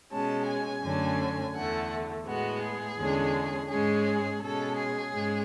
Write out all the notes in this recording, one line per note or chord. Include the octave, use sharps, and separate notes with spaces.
B2 G#3 C#4 A5
G#5
F#2 D3 A3 C#4
E2 D3 A3 F#5
A2 G#3 B3 F#4
G#4
E2 D3 G#3 C#4
G#2 G#3 C#4 G#4
B2 G#3 C#4 A4
G#4
G#2 G#3 C#4